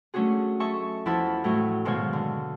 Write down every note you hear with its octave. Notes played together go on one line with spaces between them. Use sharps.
F#3 A3 C#4 D4 F#4 G#4
A4 D#5 E5 G#5 C#6
E2 F3 E4 F#5 A5 B5
A2 F#3 E4 D#5
G#2 B2 D#3 C#5 F5 G#5
D3